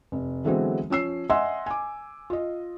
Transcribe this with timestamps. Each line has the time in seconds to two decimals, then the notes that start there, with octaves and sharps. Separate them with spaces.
0.12 F1
0.44 D3 E3 F#3 G#3 B3 C4
0.90 F3 C#4 E6 C7
1.30 D#5 E5 F#5 G#5 C6 E6
1.66 G#5 D6
2.30 F4 D#5